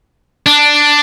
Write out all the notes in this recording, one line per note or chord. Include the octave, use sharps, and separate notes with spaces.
D4